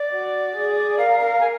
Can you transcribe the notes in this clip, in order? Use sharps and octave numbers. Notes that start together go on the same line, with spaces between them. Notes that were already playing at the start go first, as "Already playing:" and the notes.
Already playing: D5
F#4
G#4
A#4 F5
F5
G#5